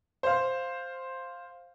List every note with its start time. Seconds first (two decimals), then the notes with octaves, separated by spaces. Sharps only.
0.23 C5 F5